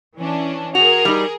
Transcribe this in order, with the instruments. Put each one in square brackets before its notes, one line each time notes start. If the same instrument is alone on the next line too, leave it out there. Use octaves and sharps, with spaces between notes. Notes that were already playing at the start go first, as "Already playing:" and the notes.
[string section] E3 C#4 D4
[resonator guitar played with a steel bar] F#4 [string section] G#4 A#4 [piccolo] F7
[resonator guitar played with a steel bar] G3 D#4